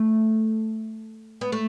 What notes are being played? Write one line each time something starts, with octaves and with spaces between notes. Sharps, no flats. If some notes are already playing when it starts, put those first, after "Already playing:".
Already playing: A3
B3
A3